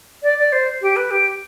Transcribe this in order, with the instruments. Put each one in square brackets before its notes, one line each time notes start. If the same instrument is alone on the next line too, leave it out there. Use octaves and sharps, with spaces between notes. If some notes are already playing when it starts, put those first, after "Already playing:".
[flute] D5
D5
C5
G4
B4
G4